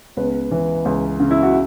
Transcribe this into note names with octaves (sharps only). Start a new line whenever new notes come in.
C#2 B3 B4
E3
C#2
C#3
E4
F#4